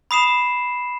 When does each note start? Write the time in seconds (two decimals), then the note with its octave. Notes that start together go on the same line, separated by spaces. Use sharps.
0.11 B5 D#6 C7 E7